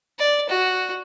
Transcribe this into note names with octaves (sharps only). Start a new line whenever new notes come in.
D5
F#4